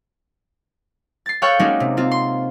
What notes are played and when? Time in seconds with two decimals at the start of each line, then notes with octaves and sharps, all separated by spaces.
1.26 A6 C7
1.42 A4 C#5 F5 G5 C#6 F#6
1.59 G#3 A#3 C#4 D#4 F#4 D5
1.80 C3
1.97 C4 F4
2.11 C6